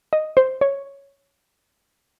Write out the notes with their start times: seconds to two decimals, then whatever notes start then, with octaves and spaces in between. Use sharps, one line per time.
0.13 D#5
0.37 C5
0.61 C#5